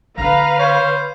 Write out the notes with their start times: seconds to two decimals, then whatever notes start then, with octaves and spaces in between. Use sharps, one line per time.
0.18 D3 B3 B4 F5 A#5
0.59 C5 C#5